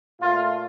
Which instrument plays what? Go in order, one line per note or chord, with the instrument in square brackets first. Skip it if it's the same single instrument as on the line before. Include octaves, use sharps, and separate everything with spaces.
[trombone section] A#2 A3 F4